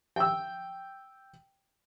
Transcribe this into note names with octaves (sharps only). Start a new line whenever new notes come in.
G5 E6